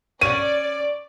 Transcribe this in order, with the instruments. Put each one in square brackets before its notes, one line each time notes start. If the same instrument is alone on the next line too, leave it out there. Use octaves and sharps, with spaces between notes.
[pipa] C#4 [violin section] D5 [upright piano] D#7